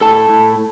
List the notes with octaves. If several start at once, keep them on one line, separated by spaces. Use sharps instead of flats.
A2 A4 A5
A2